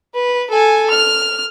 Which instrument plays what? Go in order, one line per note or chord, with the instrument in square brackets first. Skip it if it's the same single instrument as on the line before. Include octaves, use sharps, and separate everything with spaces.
[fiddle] B4
A4 G#5
F6